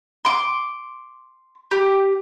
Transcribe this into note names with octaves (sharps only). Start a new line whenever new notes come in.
C6 D6
G4